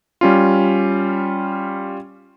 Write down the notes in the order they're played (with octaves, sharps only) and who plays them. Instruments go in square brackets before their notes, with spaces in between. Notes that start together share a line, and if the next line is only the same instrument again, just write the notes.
[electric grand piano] G3 C#4 F4